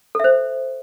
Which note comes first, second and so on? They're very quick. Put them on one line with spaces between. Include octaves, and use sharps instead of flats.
A4 E5 C5